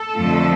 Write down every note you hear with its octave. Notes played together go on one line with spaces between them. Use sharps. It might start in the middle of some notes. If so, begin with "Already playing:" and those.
Already playing: A4
F2 D3 F3 A3